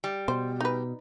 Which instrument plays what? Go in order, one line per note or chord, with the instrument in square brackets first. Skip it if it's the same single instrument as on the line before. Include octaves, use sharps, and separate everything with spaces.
[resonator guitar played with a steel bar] G3
[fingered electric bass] B2 [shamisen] C5
[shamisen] D#4 B4